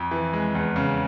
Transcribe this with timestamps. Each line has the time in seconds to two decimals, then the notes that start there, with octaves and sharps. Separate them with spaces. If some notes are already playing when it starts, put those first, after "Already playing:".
Already playing: F2
0.11 E3
0.33 G#3
0.55 E2
0.76 C#3